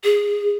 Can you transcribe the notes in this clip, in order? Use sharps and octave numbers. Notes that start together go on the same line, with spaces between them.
G#4